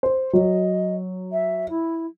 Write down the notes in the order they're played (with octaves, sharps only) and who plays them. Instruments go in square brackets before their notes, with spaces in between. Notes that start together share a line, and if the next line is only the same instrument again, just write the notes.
[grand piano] C5
[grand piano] F#3 [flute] D#5
[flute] E5
E4